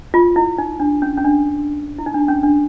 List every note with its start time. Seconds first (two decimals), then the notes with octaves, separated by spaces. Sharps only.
0.14 F4
0.36 E4
0.58 D#4
0.80 D4
1.02 C#4
1.17 C#4
1.25 D4
1.98 E4
2.06 D#4
2.14 D4
2.28 C#4
2.43 D4